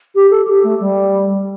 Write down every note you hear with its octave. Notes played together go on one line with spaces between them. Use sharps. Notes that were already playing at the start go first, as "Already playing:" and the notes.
G4
A4
G4
A3
G3